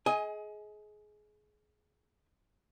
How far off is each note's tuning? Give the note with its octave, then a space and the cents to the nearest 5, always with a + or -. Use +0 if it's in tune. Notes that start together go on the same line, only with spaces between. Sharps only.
G#4 +25 D#5 +25 G#5 +0